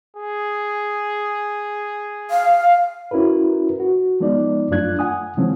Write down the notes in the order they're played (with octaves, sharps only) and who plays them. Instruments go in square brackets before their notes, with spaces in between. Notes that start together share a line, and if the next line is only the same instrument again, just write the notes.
[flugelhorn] G#4
[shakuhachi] F5
[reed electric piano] C#4 E4 F#4 A#4 B4
F#4
F3 G#3 B3 D#4 D5
F#2 A3 D4 F4 F#6 G#6
F#5 G#5 D#6
C#3 E3 F3 G#3 C4 C#4